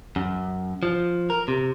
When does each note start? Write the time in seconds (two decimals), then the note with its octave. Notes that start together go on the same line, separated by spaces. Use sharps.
0.16 F#2
0.83 F3
1.30 A#4
1.48 C3